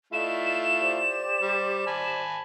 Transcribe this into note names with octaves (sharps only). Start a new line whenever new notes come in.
A3 E4 F4 D5 D#5 E7
G4 C5 D5
G3
G#5 A5 B5